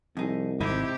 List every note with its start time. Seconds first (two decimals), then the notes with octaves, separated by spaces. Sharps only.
0.17 C2 F2 D#4 G#4
0.60 G#1 C3 D#4 E4 G4